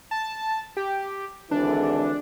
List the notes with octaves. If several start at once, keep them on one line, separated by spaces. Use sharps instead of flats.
A5
G4
G#1 D3 E3 D4